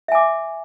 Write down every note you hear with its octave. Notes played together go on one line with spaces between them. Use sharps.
E5 G#5 D6